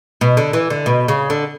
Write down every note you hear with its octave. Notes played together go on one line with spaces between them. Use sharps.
B2
D3
E3
D3
B2
C#3
D3